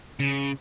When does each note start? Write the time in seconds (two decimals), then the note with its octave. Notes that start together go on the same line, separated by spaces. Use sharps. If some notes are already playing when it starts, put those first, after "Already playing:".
0.20 C#3